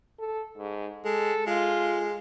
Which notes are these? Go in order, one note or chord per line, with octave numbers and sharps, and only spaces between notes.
A4
G#2
G#3 A4
G#3 F4